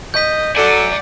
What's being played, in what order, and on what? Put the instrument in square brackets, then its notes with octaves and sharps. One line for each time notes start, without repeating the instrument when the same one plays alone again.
[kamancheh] D#5 [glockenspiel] G6 B6
[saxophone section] F#3 A4 [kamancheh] D5 [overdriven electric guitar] F#5 G#5